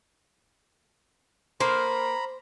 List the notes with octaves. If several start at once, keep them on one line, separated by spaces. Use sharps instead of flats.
A#3 A#4 C5 A#5 B5